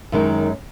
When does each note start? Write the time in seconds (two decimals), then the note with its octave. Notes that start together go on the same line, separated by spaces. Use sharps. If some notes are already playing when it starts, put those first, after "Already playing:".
0.12 F#2 D#3 G#3 D#4